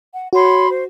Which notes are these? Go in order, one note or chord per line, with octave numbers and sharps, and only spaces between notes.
F#5
F#4 C#5 B5 C6
C5